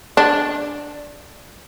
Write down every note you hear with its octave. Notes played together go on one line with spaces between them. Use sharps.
D4